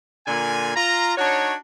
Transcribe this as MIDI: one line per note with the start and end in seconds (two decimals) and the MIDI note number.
0.27 0.71 46
0.27 0.71 50
0.27 0.71 80
0.75 1.13 65
0.75 1.13 82
1.18 1.53 62
1.18 1.53 63
1.18 1.53 66
1.18 1.53 73